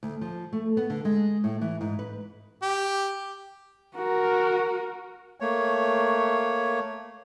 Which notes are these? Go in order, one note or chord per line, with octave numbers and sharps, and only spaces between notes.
D2
F3
A3
B3
D3
G#3
A2
E3
G#2
B4
G4
F#4 A#4
A3 A#3 C#5